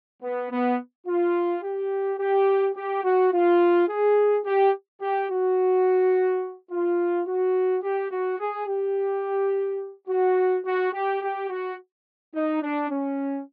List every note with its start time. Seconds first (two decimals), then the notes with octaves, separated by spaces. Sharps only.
0.22 B3
0.51 B3
1.07 F4
1.63 G4
2.19 G4
2.76 G4
3.04 F#4
3.33 F4
3.88 G#4
4.45 G4
5.01 G4
5.30 F#4
6.71 F4
7.27 F#4
7.83 G4
8.11 F#4
8.39 G#4
8.67 G4
10.08 F#4
10.65 F#4
10.93 G4
11.22 G4
11.49 F#4
12.34 D#4
12.62 D4
12.90 C#4